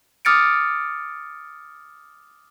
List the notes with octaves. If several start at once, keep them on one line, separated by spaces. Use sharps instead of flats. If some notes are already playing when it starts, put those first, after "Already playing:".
D6 D#6 F6 A6 C#7 D7